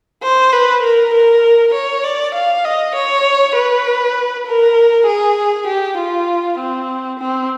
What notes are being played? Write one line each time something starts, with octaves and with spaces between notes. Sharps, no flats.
C5
B4
A#4
A#4
C#5
D5
F5
D#5
C#5
B4
A#4
G#4
G4
F4
C4
C4